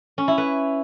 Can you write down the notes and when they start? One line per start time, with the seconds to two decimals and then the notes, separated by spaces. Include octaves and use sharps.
0.18 C#4
0.28 E4
0.38 B4